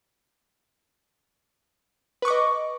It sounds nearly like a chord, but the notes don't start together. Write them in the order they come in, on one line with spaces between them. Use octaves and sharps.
B4 C#6 D6 D#5